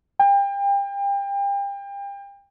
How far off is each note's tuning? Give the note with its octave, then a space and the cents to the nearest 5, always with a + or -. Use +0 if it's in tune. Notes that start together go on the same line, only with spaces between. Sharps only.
G5 +30